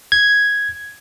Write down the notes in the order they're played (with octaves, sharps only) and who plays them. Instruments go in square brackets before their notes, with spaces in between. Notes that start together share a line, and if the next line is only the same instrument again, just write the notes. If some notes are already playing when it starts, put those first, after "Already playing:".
[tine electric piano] G#6